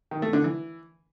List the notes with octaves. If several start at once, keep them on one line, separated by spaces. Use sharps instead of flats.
D#3
A3
D3
E3